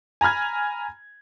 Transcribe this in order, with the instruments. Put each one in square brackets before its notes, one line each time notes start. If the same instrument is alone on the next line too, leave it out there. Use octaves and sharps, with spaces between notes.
[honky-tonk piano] G#5 A#5 B5 F6 G#6